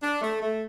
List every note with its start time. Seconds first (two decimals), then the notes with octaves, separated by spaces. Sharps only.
0.02 D4
0.22 A3
0.41 A3